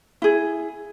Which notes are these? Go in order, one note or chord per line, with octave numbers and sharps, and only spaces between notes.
E4 G#4